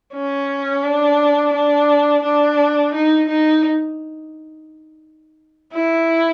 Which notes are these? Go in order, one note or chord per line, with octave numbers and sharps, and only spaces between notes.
C#4
D4
D4
D4
D#4
D#4
E4